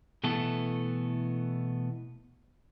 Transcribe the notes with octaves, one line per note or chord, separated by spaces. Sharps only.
B2 E3 A3 B3 A4